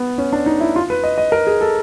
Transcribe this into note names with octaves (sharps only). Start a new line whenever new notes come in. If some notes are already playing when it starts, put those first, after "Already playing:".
Already playing: B3
C#4
D4
D#4
E4
F4
B4
D#5
D#5
A#4
G#4
A4